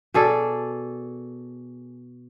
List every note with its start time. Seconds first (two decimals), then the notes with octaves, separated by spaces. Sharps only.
0.14 B2 G#4 A4 D5